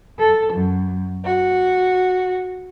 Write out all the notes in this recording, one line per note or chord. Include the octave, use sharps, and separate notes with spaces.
A4
F#2
F#4